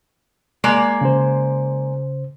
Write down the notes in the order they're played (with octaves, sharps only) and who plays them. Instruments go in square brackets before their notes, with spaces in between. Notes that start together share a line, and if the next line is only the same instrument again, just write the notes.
[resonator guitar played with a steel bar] G#3 A#3 D5
[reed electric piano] C#3 C5